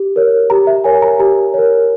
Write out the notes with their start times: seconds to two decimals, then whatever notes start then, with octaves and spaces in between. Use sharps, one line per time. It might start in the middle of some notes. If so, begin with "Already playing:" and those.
Already playing: G4
0.16 A#4 C#5
0.50 G4 A#5
0.67 E5
0.84 A#4 C#5 G#5
1.02 A#5
1.19 G4 A#5
1.54 A#4 C#5